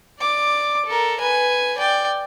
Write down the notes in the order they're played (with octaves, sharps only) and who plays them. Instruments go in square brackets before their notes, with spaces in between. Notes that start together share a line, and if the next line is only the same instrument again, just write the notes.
[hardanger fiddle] D5 D6
A4 A#4
B4 G#5
D5 G5